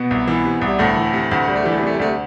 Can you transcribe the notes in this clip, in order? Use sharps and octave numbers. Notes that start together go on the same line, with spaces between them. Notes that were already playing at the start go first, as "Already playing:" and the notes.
Already playing: B2 B3
C2
E3
C3
C2
G3
D2 A2 A3
E3
C3
D2
D2 G3
A3
G3
E3
A3
G3
C3 A3
G3
D2 A3
G3